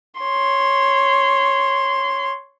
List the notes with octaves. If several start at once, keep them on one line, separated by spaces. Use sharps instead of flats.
C#5 C6